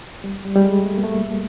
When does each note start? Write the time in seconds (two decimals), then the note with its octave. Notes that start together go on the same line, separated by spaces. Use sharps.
0.24 G3
0.45 G3
0.56 G3
0.64 G#3
0.84 A3
0.97 A#3
1.04 A3